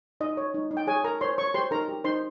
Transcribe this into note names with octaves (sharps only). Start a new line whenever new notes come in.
D#4 D#5
C#5
D#4
D#4
G5
G#4 C#5 G#5
A#4 A#5
C5 C#5 C6
C#5 C#6
G4 C5 C6
D#4 A#4 A#5
G4
D#4 C5 C6